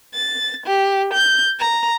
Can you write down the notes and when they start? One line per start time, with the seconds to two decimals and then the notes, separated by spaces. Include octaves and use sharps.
0.14 A6
0.66 G4
1.14 G6
1.59 A#5